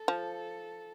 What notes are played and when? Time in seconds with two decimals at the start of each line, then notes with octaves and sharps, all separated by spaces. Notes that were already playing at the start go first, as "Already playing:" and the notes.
Already playing: A4
0.08 F3